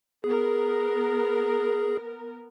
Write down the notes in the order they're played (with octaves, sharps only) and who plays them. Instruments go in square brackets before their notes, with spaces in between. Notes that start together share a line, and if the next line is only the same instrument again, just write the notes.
[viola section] B3 A#4 [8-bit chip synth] G#4